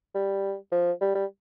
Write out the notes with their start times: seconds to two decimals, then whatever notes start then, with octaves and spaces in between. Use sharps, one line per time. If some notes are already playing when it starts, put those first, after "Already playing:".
0.15 G3
0.72 F3
1.01 G3
1.15 G3